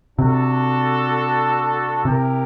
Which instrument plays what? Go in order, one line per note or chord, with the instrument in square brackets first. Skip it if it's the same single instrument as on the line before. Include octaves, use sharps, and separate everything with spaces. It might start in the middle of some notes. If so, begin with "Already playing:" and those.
[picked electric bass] C3 [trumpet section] D4 F#4 A4
[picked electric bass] C3 [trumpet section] E4 G4 A#4